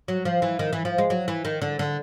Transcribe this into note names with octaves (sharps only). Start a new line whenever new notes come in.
F#3
F3
E3
D#3
E3
F3
G#3
F#3
E3
D#3
D3
D3